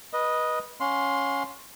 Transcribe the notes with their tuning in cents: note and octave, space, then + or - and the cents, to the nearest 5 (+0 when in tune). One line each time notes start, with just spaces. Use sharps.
B4 -20 D#5 +0
C#4 +0 F5 +40 C6 +0